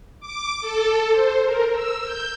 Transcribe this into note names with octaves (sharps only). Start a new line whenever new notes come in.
D6
A4
C5
A#4
E6
G6